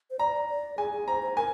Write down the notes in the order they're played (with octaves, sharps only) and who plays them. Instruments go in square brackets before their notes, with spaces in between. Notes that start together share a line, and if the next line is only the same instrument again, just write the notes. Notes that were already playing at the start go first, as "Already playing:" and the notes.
[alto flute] C5
[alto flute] D5 [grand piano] A#5
[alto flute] D5
[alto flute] G#4 [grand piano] G#5
[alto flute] G#4
[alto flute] C5 [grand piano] A#5
[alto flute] C5
[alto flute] A#4 [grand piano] G#5